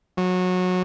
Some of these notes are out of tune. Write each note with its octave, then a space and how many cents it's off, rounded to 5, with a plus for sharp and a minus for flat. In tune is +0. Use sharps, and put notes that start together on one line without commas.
F#3 -20